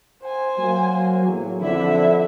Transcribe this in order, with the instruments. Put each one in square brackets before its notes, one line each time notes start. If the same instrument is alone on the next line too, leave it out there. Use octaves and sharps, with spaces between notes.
[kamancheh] C5 G#5
[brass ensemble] F#3 A#3
E2 A2 F#3
[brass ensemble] F2 D3 [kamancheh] E4 E5